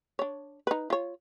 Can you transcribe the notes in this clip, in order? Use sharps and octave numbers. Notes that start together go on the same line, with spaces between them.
D4 C#5
D#4 B4
F4 C#5